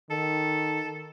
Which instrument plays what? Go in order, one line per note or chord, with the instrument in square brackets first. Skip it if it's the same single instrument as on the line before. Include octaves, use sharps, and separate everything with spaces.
[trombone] D#3 [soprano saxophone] A4